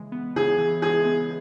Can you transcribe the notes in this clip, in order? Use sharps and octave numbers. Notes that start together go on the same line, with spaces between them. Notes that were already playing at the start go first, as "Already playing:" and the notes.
Already playing: C#3 E3 G#3
B3
C#3 G#4
E3
G#3 G#4
B3